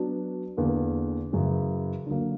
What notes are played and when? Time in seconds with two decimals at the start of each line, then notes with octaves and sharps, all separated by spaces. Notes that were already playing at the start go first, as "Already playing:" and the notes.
Already playing: F#3 B3 D4 F#4
0.57 E2 D3 A#3
1.32 F#2 C#3 E3
2.07 D3 F#3 A#3